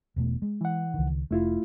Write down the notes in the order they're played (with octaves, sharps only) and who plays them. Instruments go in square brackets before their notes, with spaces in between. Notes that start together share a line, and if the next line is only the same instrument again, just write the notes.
[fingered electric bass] E1 B2 A3
G#3
[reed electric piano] E3 F#5
[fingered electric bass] C#2 D#3
[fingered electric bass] F1 [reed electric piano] A3 E4 F4